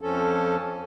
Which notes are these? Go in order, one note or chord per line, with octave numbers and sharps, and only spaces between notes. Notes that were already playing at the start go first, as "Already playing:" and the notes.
F2 F3 C#4 A4